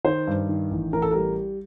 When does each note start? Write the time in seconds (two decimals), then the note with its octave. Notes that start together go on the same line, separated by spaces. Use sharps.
0.05 D#3 C5
0.27 G2
0.49 D#3
0.71 A1
0.93 A1 A#4
1.02 A4
1.11 G3 A#4